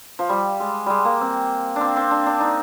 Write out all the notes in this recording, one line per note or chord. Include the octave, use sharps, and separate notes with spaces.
F3
G3
G#3
G3 G#3
A#3
C4
C4 D4
C4
D4
D4
D#4